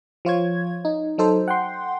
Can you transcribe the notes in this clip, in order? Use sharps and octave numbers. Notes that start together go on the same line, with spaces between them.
F3 F4 C#5 G#6
D#4
F#3 D#4 A4 C5
F#5 G5 C6